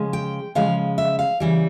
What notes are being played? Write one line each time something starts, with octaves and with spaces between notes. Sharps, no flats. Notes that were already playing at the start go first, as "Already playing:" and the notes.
Already playing: C#3 F3 G#3
G5
C#3 F3 G#3 F5
E5
F5
C#3 E3 G3